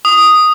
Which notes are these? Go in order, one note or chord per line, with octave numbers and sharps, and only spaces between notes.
D#6